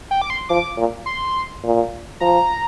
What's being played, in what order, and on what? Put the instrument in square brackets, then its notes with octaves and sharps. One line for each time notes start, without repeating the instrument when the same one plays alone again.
[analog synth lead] G5
D6
C6
[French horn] F3 [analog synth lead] D6
[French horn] A#2
[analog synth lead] C6
[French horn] A#2
[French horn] F3 [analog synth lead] A#5